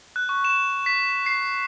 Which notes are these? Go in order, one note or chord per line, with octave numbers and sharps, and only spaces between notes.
F#6
C#6
E7
B6
C7